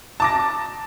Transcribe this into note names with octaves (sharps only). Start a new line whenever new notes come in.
A5 D6 A#6